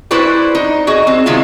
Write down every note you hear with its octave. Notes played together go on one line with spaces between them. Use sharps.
E4 F#4 B4 C5 D5
D#4
F#4 G#4 D#5
C4
C3 D#3 G#3 B3 E4 F4